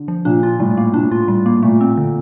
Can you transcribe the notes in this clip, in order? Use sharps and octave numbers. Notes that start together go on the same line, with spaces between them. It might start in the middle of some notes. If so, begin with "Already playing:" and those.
Already playing: D3
F3
A#2 D4
F4
A2 G3
A#3
A2 D4
F4
G3
A#3
A#2 A3
C4
D3